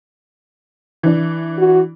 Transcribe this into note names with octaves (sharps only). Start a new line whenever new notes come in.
E3 D4
F#4